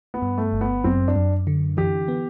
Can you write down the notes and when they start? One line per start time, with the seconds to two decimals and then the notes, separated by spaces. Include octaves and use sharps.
0.14 B3
0.22 G2
0.38 A3
0.53 G1
0.61 B3
0.84 F#2 C4
1.08 D4
1.16 F#2
1.47 D3
1.77 E3 G4
2.08 B3